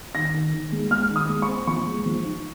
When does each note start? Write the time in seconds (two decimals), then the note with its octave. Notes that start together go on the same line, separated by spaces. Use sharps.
0.14 D#3 A#6
0.34 D#3
0.53 D#3
0.72 G#3
0.91 G#3 F6
1.10 D#3
1.16 D#6
1.29 G#3
1.42 C#6
1.48 C4
1.67 F3 C#6
1.87 G#3
2.06 F3
2.24 D#4